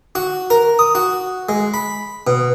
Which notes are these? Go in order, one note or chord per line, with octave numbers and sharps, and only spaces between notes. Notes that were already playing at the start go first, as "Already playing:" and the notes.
F#4
A#4
D#6
F#4
G#3
B5
B2